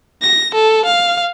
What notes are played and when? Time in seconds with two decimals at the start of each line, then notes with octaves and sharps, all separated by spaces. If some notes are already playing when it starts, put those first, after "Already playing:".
0.22 A#6
0.55 A4
0.86 F5